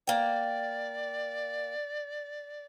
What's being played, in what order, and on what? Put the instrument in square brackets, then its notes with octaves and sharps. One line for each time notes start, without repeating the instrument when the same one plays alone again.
[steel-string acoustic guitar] A#3 G5 [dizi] D5